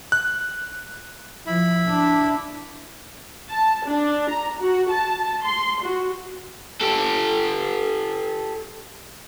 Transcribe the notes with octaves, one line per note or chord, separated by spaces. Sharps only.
F#6
F3 E4 B5
D4
A5
D4
A#5
F#4
A5
C6
F#4
G4 A4